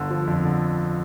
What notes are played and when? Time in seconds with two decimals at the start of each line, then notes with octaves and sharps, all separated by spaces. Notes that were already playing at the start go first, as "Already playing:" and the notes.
Already playing: G1 D3
0.10 F3
0.27 F2
0.45 D3